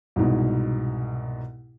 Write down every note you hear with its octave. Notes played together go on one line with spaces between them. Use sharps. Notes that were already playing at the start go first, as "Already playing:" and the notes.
C2 G#2 B2